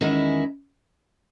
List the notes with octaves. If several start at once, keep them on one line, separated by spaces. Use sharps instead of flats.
E2 D#3 G#3 C#4 E4